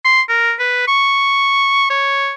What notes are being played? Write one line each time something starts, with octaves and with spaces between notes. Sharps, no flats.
C6
A#4
B4
C#6
C#5